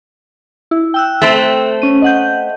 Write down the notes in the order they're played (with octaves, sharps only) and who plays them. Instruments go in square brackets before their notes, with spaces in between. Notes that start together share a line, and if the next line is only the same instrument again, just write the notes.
[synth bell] E4
G5 E6 F#6
[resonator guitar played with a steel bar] A3 C4
[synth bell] C#4 D#7
D#5 F#5 G6